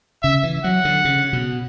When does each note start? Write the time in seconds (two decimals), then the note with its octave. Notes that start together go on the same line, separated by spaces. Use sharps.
0.23 C#3 E5
0.43 E3
0.64 F#3 F#5
0.85 D3
1.05 C#3
1.33 B2